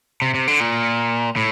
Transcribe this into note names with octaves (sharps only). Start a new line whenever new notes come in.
C3
C3
D3
A#2
A2